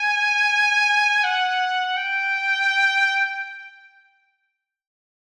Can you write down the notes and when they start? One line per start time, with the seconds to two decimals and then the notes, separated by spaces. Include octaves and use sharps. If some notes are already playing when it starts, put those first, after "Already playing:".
Already playing: G#5
1.24 F#5
1.97 G5